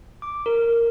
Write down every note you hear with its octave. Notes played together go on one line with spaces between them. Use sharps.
D6
A#4